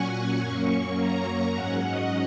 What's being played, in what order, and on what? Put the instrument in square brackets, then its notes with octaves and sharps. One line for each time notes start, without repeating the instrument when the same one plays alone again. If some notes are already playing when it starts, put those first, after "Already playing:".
Already playing: [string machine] A#2 F#3 C#4 F#5 G#5 C#6
F#2 F#3 A#3 C#4
A#5
G#2 F#3 C#4 F#5
D#5